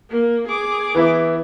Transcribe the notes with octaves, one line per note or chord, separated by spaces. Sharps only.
A#3
G#4 D6
E3 B3 E4